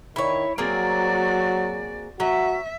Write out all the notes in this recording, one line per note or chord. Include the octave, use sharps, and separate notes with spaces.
D#3 E4 C#5
F#3 A#3 C4 F#4 G#4 D5
F#3 F#4 E5